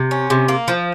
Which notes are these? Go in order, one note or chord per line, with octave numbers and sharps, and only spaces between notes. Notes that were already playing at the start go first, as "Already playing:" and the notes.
Already playing: C3
C#4
C3
A#3
F3